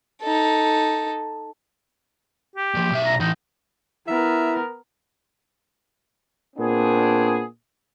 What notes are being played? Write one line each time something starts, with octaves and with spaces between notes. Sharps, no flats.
D#4 A4
G4
A#2 F3
B1 E5
A#5
E3 D#4 A4
B3 E4 A#4 E5
A#2 B3 C4 D4 G#4